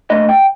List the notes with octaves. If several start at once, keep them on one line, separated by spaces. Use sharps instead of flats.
A#2 A3 D4 D#5
G5